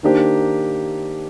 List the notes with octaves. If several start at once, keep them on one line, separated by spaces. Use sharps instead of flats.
D#3 A#3 D4 G4 C5